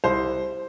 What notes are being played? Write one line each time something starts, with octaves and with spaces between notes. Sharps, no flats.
C2 C5